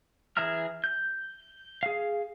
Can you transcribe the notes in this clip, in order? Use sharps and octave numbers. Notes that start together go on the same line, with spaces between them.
E3 G#4 E5 A#5 F6
G6
G#4 F5